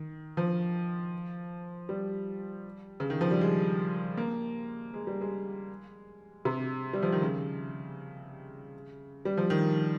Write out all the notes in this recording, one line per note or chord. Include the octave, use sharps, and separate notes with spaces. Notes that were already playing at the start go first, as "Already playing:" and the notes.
Already playing: D#3
F3
G3
C#3
D#3
F3
G3
G#3
A#3
G#3
G3
G#3
C3
G3
F3
D#3
C#3
G3
F3
D#3